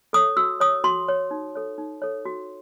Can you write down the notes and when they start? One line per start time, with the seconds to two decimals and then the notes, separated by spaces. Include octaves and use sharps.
0.13 A4 C#5 D#6
0.37 F#4 E6
0.60 C#5 D#6
0.84 F#4 C6
1.08 C#5
1.31 D#4
1.55 A4 C#5
1.78 D#4
2.02 A4 C#5
2.25 F#4